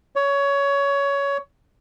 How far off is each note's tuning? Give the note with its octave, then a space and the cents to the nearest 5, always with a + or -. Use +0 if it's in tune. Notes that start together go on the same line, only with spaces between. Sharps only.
C#5 +20